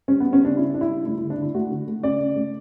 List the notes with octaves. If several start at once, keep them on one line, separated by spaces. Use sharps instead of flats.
G3 C#4
G3 B3
C#4
C#3 D4
C#3 E4
C#3 D4
E4
G3
A3 E4
D3 E4
D4
D3 E4
A3 F#4
D3
A3
C#3 D5
C#3
A3